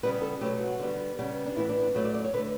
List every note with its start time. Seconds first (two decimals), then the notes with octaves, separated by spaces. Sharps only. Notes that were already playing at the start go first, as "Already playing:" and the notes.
0.03 C#3 G3 B3 B4
0.22 A4
0.41 B2 F#3 A3 G4
0.61 F#4
0.79 D3 G3 B3
1.19 C#3 G3 B3
1.46 D4
1.56 A2 E3 B3 E4
1.69 D4
1.82 D4
1.94 A2 F#3 A3 F#4
2.04 D5
2.14 D5
2.24 C#5
2.34 D3 B4
2.38 A3